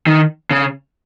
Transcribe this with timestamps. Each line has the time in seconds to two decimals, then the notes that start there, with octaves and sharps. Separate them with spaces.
0.07 D#3
0.51 C#3